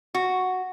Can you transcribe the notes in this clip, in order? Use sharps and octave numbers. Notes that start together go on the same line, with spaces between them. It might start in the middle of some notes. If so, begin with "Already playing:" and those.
F#4